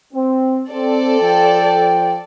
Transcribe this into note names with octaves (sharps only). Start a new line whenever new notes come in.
C4
C4 A4 D5
F3 G5